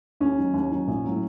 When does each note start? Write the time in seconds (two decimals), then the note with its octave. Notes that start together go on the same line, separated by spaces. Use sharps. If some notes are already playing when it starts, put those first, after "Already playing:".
0.20 D#2 C#4
0.38 D#3 F#3
0.54 D#2
0.71 D#3 F#3
0.88 A#1
1.04 A2 F#3